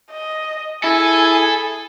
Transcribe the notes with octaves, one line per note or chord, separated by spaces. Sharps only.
D#5
E4 G#4 A4 G#5